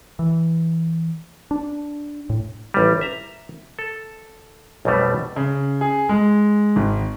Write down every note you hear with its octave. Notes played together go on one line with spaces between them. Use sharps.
E3
D4
A2
A1 G3
E5 A#5
A4
B1 F2 B2 G3 A3
C#3
G#4
G#3
G#1